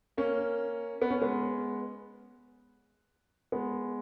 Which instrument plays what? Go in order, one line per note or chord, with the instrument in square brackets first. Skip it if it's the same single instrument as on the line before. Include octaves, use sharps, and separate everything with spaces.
[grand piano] A#3 C#4
B3
C#4
G#3 B3
G#3 B3